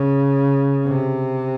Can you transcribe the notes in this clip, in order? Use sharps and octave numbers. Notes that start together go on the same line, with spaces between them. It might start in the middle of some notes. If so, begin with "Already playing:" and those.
Already playing: C#3
C3